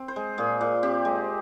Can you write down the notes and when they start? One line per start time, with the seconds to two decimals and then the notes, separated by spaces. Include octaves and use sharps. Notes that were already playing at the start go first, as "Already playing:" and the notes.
Already playing: C4
0.08 C5
0.16 G#3
0.38 A#2 G#4
0.61 A#2
0.83 C4 G4
1.05 G#3